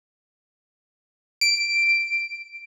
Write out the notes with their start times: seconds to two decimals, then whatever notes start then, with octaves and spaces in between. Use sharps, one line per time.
1.41 D7